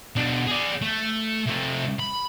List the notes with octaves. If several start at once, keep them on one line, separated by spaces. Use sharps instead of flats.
B2 D4
G#4 D5
A3
C3 A3
B5